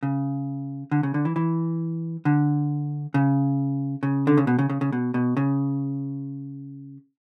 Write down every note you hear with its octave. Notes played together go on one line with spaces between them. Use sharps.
C#3
D3
C#3
D3
E3
E3
D3
C#3
C#3
D3
C#3
B2
C#3
C#3
C#3
B2
B2
C#3